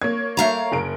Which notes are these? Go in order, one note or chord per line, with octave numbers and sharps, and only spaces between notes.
A#3 C#5 G#6
A3 F5 A#5
F#1 A#4 D7